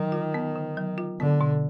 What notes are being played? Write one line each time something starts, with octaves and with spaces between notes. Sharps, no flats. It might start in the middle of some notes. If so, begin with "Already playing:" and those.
Already playing: D#3 F#3
F4
B3
D3
F#3
F4
D3 B3
B2